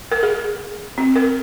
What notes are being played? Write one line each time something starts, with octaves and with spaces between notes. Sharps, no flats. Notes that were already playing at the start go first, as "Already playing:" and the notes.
A#4
G#4
C4
A#4